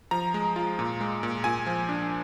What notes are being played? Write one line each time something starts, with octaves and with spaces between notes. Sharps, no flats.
F3 A#5
G#3
F4
A#2
G#3
A#2
A#2 G#5
F3
D4